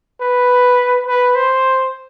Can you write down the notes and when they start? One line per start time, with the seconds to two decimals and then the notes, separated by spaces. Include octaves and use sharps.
0.21 B4
1.07 B4
1.35 C5